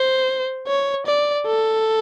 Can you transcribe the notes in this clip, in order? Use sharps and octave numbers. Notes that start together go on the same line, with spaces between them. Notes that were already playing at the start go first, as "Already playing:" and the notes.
Already playing: C5
C#5
D5
A4